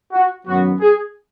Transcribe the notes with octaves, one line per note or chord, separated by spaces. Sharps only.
F#4
F#2 D#3 F#3 B3 F#4
G#4